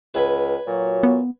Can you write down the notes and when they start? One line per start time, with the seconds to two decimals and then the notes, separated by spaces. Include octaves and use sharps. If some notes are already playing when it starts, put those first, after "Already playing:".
0.14 C#2 B4 G#5 B5
0.67 A#2 F#3 F#4 C#5
1.03 B3